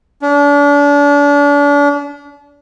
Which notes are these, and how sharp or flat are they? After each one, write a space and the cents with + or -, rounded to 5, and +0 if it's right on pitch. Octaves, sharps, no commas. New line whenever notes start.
D4 -35